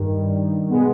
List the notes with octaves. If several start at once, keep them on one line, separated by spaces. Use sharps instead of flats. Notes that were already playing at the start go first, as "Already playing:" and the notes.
Already playing: G2 D#3 G3
B2 G#3 B3